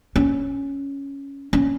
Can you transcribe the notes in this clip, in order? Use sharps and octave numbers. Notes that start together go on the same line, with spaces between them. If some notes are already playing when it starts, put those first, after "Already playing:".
C#4
C#4